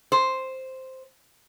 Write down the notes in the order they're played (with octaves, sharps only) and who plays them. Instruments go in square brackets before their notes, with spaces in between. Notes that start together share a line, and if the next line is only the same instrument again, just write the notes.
[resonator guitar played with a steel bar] C5